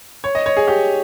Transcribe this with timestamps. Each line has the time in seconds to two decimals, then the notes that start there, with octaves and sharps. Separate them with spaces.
0.24 C#5
0.35 D#5
0.46 C#5
0.57 G#4
0.67 G4